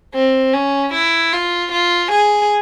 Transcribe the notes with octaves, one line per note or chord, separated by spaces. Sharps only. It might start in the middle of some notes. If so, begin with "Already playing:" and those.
C4
C#4
E4
F4
F4
G#4